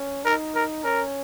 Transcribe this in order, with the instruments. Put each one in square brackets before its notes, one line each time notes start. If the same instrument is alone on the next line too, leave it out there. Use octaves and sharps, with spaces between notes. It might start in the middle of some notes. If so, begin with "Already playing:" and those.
Already playing: [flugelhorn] C#4
[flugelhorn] D#4 [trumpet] A#4
[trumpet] A#4
[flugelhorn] C#4 [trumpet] A#4